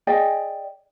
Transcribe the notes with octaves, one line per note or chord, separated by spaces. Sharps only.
G#4 D5 D#5 G5